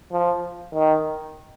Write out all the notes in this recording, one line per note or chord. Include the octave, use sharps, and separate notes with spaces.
F3
D#3